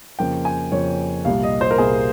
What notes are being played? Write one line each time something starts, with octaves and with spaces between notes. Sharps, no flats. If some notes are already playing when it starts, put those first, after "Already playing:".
F2 C#3 F3 A#3 G5
G#5
F2 C#3 F3 A#3 C#5
C2 A#2 G3 F5
D#5
C5
A#4
C2 A#2 G3 G#4